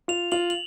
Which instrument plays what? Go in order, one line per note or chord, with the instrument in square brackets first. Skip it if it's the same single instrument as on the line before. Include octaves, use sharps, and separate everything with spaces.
[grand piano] F4 [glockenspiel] F7
[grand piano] F4 [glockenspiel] F#7
[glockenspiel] F#7